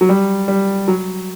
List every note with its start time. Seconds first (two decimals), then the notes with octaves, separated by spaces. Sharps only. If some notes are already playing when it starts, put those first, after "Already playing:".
0.01 F#3
0.09 G3
0.48 G3
0.88 F#3